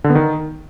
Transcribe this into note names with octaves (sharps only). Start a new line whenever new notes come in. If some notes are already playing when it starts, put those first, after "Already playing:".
D3
B3
D#3